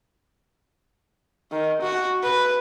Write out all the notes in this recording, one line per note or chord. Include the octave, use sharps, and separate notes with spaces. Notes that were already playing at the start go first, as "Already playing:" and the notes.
D#3
F#4
B4